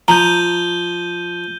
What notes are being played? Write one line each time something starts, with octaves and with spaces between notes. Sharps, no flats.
F3 A#5 G6 D#7 G7